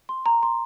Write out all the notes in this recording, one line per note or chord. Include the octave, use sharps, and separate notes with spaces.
C6
A#5
C6